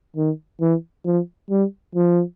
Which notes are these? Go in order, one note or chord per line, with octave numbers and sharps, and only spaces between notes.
D#3
E3
F3
G3
F3